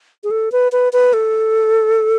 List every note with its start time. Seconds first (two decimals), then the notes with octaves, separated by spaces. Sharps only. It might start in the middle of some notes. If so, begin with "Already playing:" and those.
0.24 G#4
0.31 A4
0.52 B4
0.72 B4
0.93 B4
1.13 A4